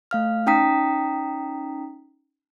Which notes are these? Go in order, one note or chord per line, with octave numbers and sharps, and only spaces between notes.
A3 F5 F6
C#4 D#4 G5 A#5 D#6 B6